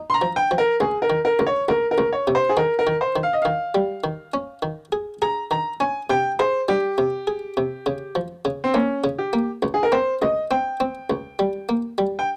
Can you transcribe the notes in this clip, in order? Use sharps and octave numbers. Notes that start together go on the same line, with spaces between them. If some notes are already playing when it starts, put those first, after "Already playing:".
Already playing: D#4
C6
A#5
F3
G5
F3
A#4
C#2 G#4
A#4
D#3
A#4
C#2
C#5
C#2 A#4
A#4
C#2
C#5
C3
C5
G#4
D#3 A#4
A#4
D#3
C5
D#3
F5
D#5
D#3 F5
G3
D#3
C#4
D#3
G#4
G#4 A#5
D#3 A#5
C#4 G#5
C3 G5
G#4 C5
G3 G4
C3
G#4
C3
C#3
F3
C#3
C4
A#3 C#4
C#3
G4
A#3
C#2
G#4
A#4
C4 C5
C#2 D#5
C4 G5
C4
C#2
G3
A#3
G3
G5